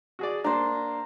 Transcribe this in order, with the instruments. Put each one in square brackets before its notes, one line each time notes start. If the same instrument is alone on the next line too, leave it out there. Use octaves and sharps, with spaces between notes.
[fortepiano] F#4 G#4 D5
[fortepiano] A#3 D4 [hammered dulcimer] C5 A#5